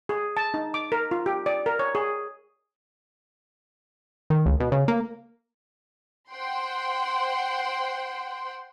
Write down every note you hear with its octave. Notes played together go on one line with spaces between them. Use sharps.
G#4
A5
D#4
D6
A#4
F4
G4
D5
A#4
C#5
G#4
D#3
C#2
B2
C#3
A#3
C5 F#5 G5 C6